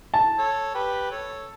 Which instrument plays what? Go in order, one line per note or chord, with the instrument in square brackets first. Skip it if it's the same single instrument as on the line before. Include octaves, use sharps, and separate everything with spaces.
[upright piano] A5
[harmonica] A4 C#5
G4 B4
A4 C#5